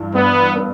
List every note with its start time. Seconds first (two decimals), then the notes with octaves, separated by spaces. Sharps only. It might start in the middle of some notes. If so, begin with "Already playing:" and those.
Already playing: G2 E3
0.14 G2 B3
0.56 B3